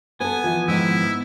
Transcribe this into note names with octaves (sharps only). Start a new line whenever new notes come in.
B3 A4 B4 G#5
E3 F3
G#2 D#3 F3 E4